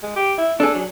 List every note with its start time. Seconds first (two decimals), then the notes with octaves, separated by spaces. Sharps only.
0.03 G#3
0.16 G4
0.38 E4
0.60 D4 G#4 A4
0.75 F#3